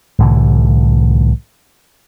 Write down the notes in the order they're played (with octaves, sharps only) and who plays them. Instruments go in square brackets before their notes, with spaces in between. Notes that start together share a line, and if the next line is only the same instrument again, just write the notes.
[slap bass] C2 A2 D3 E3